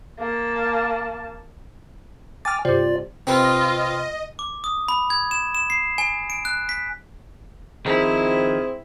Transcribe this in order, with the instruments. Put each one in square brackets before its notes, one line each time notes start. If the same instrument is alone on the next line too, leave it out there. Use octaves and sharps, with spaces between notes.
[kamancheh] A#3 A5
[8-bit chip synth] G5 G#5 D6 [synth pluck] F6 A6
[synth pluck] G2 C3 [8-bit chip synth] F4 D5
[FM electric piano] C3 [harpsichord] C4 B4 [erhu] F4 [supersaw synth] D#5
[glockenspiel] D6
D#6
B5
G#6
E7
E7
C7
G#5
D7
F#6
B6
[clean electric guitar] D#3 F3 [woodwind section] C4 G#4 [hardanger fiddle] E4